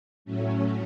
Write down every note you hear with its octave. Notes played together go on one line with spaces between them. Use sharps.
A2 F#3 A3 C#4